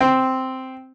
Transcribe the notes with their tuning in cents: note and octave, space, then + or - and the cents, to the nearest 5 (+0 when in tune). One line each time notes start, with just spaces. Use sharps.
C4 -5